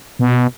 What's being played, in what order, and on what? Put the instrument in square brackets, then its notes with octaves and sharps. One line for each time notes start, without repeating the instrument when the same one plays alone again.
[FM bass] B2